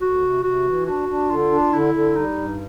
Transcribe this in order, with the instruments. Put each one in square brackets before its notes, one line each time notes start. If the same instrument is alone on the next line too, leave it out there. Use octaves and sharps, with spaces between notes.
[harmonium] D2 [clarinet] F#4
[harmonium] C3
[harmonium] C3 [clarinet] F#4
[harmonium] E3
[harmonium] D4 [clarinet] F#4
[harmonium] D4
[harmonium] D3 [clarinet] F4
[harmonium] D4
[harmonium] D3 [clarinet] E4
[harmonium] D3
[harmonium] G3 [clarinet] D#4
[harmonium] G2